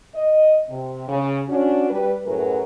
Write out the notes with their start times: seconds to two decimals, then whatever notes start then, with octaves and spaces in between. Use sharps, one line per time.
0.15 D#5
0.69 C3
1.08 C#3
1.49 C#4 D4 F#4
1.90 G3 B4
2.26 F#2 A2 F#3 G#4 A#4 B4